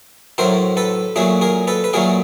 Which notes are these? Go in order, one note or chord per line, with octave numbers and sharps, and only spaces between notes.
A2 F#3 A3 A#4 C5
A4 B4
A#2 F#3 A3 F#4 G#4
G#4 A#4
A4 B4
B4
A#2 F#3 A3 G#4 A#4